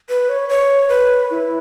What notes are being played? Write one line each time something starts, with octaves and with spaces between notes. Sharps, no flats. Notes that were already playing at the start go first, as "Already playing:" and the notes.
B4
C#5
C#5
B4
E4